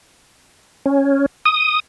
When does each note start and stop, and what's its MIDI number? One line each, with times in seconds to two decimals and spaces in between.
0.86 1.26 61
1.45 1.80 87